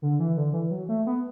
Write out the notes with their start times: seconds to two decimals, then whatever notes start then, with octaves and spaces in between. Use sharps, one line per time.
0.02 D3
0.19 E3
0.37 D3
0.53 E3
0.71 F#3
0.89 A3
1.07 B3